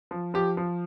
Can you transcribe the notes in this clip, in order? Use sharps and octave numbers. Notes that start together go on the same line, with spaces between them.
F3
F3 G4
F3